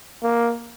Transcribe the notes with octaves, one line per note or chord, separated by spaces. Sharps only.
A#3